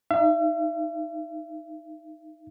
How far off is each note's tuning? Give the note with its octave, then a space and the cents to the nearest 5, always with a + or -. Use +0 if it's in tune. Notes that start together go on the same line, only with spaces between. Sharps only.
D#4 +0 E5 +45